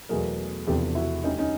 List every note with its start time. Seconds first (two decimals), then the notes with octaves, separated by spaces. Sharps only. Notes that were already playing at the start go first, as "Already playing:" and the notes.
0.09 E2 B2 F#3 A3 G#4 A#4
0.67 E1 E2 C3 F3 G4 A4
0.95 E4 F#4
1.24 D2 D3 G3 C#4 D#4
1.38 C#4 D#4